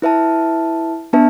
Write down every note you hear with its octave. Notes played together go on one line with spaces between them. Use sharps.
E4 B4 E5 A5
B3 D4 B4 E5 A5